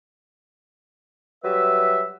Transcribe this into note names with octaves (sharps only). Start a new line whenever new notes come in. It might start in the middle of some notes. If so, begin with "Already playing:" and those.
F#3 G3 B4 E5